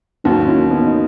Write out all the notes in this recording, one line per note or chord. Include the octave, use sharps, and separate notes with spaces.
D#2 D#3 F#3 A#3 C#4
F#4
C#4 E4
B3 D#4
D#4